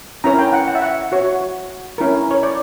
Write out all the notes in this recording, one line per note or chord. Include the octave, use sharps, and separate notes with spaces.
C#4 E4 A#4 C#5 A#5
G5
F#5
F#5
E5
F#5
F#4 C#5
C#4 E4 A#4
C#5
D5